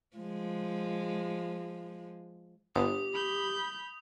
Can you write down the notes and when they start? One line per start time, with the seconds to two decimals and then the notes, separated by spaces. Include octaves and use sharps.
0.17 F3 G#3
2.76 G1 G4 D#6
3.13 B5 G6